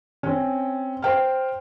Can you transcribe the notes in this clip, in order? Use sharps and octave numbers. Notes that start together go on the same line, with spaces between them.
C4 C#4
C5 G5 F6